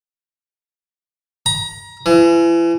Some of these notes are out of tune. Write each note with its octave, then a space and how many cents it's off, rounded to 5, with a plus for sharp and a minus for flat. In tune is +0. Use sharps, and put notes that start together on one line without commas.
A#5 +30
E3 +35